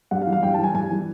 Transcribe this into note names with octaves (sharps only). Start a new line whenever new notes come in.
G2 F#5
F5
E3
F5
G2 G5
E3 A5
G#5
G2 G#5
E3